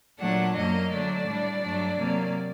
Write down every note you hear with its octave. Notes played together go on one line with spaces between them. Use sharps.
A#2 F#3 A3 D4 F#5
F#2 F#3 A#3 D#5
D3 F#3 A3 D4 D5
A2 G3 D4
G2 F#3 A3 D4
C3 F#3 A#3